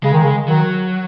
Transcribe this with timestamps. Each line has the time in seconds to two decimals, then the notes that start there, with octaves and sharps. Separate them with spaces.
0.03 C#3 G#3
0.13 D#3
0.23 C#3
0.48 D#3 F#3